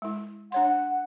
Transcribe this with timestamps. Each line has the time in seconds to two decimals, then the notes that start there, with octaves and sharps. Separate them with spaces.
0.02 G#3 E4
0.52 D4 C#5 F#5 C6
0.68 F#5